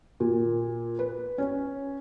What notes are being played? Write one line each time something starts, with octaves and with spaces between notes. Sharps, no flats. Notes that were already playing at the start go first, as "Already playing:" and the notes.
A#2
B4
C#4